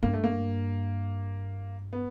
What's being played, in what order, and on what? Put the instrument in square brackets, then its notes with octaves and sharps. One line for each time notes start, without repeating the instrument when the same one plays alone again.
[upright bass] G2 [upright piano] A#3
[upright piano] A3
A#3
B3